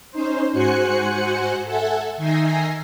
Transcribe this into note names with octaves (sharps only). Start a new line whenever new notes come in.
C#4 D#4 C5
G#2 F#4 C5 G#5 F#6 C#7
A4 E5 F#5 G#5
D#3 D#4 E5 G#5 A#6 C7